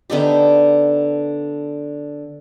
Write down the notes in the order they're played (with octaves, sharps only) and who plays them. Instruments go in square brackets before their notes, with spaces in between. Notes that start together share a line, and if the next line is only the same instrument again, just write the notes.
[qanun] D3 B3 D#4 G4